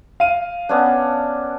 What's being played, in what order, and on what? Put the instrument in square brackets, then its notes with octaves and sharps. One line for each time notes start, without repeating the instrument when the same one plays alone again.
[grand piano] F5 D#7
[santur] B3 C#4 D4